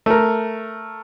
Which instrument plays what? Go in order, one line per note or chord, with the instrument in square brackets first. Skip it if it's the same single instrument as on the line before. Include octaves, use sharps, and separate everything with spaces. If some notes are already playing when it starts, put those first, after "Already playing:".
[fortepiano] A3 A#4